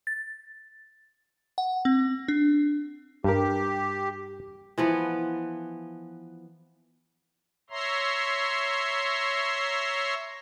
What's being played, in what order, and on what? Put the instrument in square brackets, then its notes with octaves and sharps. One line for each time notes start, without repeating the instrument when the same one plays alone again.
[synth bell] A6
F#5
C4
D4
[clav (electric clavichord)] G2 A#4 [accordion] G4
[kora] E3 F3 B3
[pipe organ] C#5 E5 A#5 C6